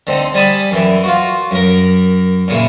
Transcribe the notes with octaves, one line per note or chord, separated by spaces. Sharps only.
D3 C4 D#4
G3 G#5 A5 B5 D#6
F#2 E3
F4 F#4
F#2 A#4
A#2 C#3 E3